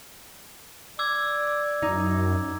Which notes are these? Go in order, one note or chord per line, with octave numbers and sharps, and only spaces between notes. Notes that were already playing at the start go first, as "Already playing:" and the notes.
D5 D6 E6 G#6
F#2 D#4